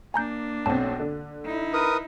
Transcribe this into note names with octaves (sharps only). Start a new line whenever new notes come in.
A#3 D4 G#5 A#5 G6
B1 C4 A5
D3
D#4 E4
A#4 B4 D#6